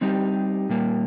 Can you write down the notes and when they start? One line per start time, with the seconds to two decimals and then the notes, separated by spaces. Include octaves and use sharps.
0.01 G3 C4 D#4 G4
0.69 A#2 G3 A#3